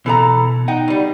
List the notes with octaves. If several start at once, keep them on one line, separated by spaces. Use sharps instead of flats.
B2 E3 A4 A#5
D#4 F#5 G5
B2 G3